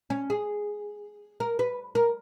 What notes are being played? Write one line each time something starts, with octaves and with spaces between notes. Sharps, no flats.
C#4
G#4
A#4
B4
A#4